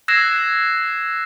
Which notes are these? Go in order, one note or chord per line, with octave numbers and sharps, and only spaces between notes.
E6 F#6 G#6 A#6 C7 E7